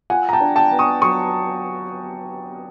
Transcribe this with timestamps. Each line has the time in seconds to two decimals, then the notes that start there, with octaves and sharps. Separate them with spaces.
0.10 F4 F#5 G#5
0.29 A#5
0.33 G5 A5
0.41 D4
0.56 G5 A5
0.71 B3
0.79 C#6 D#6
1.02 F#3 C#6 D#6